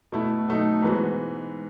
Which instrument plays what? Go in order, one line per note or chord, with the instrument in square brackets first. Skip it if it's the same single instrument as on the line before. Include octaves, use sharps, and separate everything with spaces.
[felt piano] B2 A3 E4
B2 F#3 A3 D#4
G#2 E3 B3 F#4